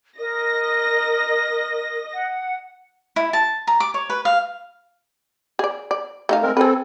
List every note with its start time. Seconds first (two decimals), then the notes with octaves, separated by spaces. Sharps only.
0.19 A#4 D#5 A#6
2.14 F#5
3.16 E4
3.33 A5
3.67 A#5
3.80 D6
3.94 C#5
4.10 B4
4.25 F5
5.59 G#4 D5
5.91 D5
6.29 A3 D#4 F5
6.42 G#3 C4 A#4
6.57 C4 G#4 A4 B4